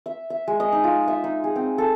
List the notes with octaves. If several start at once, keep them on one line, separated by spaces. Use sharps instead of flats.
E5
E5
G#3
D#5
D#4
F4
E5
D#4
G#4
C4
A4